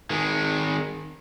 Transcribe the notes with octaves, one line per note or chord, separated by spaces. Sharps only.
D#3 G#3